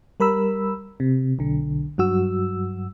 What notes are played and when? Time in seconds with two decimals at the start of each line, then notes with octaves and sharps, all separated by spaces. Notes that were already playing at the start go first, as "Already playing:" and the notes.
0.20 G3 A#4 B5 E6
1.00 C3
1.39 B1 D3
1.98 G2 F#3 F#4 E6